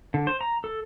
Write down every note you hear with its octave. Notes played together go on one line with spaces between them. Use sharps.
D3
C5
A#5
A4